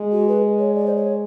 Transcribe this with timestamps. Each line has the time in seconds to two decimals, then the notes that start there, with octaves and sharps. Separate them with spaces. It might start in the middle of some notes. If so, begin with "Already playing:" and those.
Already playing: G#3
0.12 F#4
0.28 B4
0.59 C#5
0.75 D5
0.86 C5
0.96 C#5